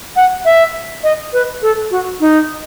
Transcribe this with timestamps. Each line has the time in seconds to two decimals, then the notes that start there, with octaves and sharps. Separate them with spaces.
0.16 F#5
0.45 E5
1.04 D#5
1.33 B4
1.62 A4
1.91 F#4
2.20 D#4